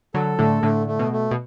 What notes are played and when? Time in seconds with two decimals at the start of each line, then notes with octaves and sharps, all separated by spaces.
0.14 D3 F#3 A4
0.39 A2 D3 A3
0.63 A2 D3 A3
0.87 A3
0.99 B2
1.12 A3
1.31 B2